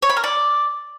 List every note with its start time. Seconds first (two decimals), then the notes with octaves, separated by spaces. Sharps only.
0.02 C#5
0.10 B5
0.17 A#4
0.24 D5